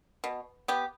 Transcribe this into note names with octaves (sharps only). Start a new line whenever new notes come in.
B2
B3 G4